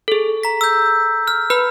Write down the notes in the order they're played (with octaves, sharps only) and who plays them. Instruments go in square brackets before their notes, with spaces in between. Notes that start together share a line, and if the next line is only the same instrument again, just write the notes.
[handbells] G#4 A4
[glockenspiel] A#5 B6
E6 G6
F6
[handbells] B4 [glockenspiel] B5 F6